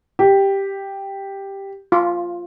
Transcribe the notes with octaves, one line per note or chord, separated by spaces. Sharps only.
G4
F4